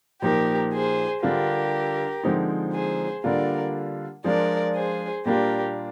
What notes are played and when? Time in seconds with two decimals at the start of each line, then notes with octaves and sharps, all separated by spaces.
0.22 A#2 F3 A#3 D#4 G4 A#4
0.72 G#4 C5
1.23 D3 G3 D4 F4 G4 A#4
2.24 D3 F3 G#3 C4 D#4
2.73 G#4 C5
3.23 D3 G3 A#3 D4 F4 A#4 D5
4.24 F3 G#3 D4 F4 A#4 D5
4.75 G#4 C5
5.25 A#2 G3 A#3 D4 F4 G4 A#4